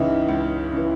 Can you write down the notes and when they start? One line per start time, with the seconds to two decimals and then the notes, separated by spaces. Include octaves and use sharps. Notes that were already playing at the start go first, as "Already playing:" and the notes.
Already playing: C#2 C#3 E3 D#4 E4
0.28 C#2
0.73 C#3 E3